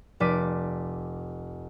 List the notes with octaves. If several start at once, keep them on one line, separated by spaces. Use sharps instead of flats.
F1 D5 D6 B6 D#7